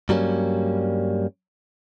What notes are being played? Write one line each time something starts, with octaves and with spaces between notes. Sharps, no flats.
G2 F#3 G3 A#3 C#4